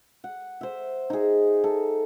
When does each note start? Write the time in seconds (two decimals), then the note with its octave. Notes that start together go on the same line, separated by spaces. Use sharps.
0.24 F#5
0.61 C5 E5
1.10 D#4 G#4
1.64 A4